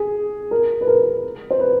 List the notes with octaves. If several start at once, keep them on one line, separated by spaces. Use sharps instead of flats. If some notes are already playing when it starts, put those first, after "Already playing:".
Already playing: G#4
A#4
B4
A#4
C5
B4